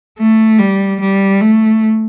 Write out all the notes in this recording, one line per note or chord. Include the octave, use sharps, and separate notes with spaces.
A3
G3
G3
A3